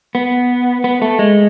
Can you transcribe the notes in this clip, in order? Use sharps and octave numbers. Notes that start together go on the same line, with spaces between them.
B3
B3
A3
G#3